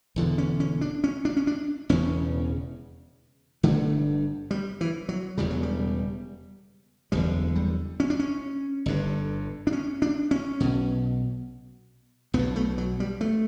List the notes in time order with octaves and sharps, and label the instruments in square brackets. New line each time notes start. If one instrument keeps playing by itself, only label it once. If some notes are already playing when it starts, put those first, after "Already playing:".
[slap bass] E1 E2 D3
C#4
C#4
D4
C#4
D4
C#4
D4
E1 E2 C#3 C#4
G1 G2 D3 A3
G3
E3
F#3
E1 E2 C#3 G3
F#3
G3
F#1 E2 D3 G3
G3
C#4
D4
C#4
G1 G2 D3
D4
C#4
D4
C#4
B1 B2
B1 B3
B2
A3
F#3
G3
A3